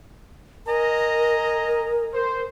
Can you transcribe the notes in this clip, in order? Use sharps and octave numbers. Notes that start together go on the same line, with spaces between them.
A#4 D#5 G#5 A#5
C5